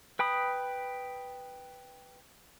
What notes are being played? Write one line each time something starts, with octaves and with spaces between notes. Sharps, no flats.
B4 G5 B5 D#6